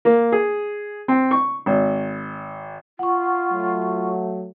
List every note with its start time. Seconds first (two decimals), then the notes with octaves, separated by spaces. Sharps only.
0.05 A#3
0.32 G#4
1.08 C4
1.31 C#6
1.66 G#1
2.99 F4 F#5 C#6
3.52 F#3 A3